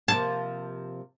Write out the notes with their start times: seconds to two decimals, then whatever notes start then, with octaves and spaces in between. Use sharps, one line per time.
0.08 C3 F3 A#3 A5